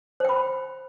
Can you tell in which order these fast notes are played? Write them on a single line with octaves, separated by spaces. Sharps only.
C5 G5 B5